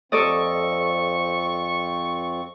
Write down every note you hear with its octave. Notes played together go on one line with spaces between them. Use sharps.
F2 F3 C4 A4 D5 D#5 C#6